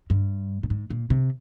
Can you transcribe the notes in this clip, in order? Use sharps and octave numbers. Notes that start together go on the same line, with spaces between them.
G2
A#2
G#2
A#2
C3